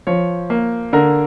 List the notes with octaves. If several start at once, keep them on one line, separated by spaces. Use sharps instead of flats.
F3 C#5
A#3
D3 A#4